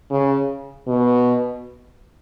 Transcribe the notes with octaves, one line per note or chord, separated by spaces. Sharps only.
C#3
B2